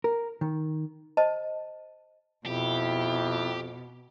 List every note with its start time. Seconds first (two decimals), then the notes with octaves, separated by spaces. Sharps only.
0.04 A#4
0.41 D#3
1.17 C5 D#5 A5
2.46 F2 B2 E4 G4